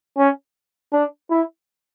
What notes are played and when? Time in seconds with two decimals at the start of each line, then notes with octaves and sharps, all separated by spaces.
0.18 C#4
0.93 D4
1.31 E4